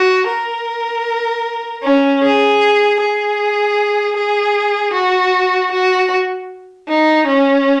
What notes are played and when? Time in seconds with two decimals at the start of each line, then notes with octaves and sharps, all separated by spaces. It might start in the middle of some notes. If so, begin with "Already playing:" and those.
Already playing: F#4
0.28 A#4
1.83 C#4
2.23 G#4
3.00 G#4
4.17 G#4
4.94 F#4
5.72 F#4
6.89 D#4
7.27 C#4